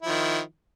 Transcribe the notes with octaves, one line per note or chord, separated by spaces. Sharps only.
D#3 F3 E4